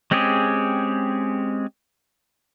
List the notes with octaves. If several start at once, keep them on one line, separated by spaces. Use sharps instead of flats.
G#3 C4 C#4 G4 G#4